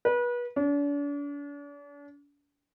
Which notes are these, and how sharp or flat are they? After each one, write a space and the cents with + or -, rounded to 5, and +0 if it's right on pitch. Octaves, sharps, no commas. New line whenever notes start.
B4 -30
D4 -40